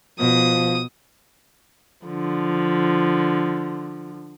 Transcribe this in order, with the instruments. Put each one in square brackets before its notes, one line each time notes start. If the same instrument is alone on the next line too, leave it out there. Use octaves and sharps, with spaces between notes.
[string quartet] B2 [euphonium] F3 [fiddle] D#6
[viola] D3 F3